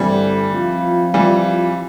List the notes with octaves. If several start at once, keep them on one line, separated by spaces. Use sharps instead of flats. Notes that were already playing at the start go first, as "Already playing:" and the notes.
Already playing: G2 D3 E3 G3 A3 C4
F3 C4 F4
E3 G3